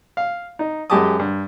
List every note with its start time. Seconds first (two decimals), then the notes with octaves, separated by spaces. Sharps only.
0.17 F5
0.59 D#4
0.90 F#2 G#3 G4 A5 D6 D#6
1.19 G2